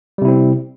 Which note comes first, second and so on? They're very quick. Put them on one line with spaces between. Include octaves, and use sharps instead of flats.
G3 C3 E4 C4